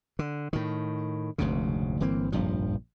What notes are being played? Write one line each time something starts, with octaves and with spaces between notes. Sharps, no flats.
D3
A2 D#3
F1 D2 G#2 C#3
G1 E3 A#3 C4
F1 A#1 G2 F3